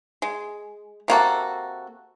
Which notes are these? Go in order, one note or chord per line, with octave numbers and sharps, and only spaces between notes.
G#3
C3 A#3 F#4 A4